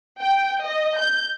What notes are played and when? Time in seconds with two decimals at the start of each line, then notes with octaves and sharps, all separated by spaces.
0.22 G5
0.64 D#5
0.99 G6